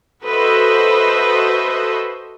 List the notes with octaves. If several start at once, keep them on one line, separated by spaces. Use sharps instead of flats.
F#4 A4 B4 C5 D#5 E5